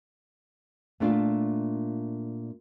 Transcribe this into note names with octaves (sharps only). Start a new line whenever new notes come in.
A#2 A3 D4 F4